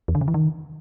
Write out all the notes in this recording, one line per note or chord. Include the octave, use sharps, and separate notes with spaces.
E2
D3
C#3
E3
D#3